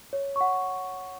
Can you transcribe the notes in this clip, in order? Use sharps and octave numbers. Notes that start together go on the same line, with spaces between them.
C#5
F#5 C#6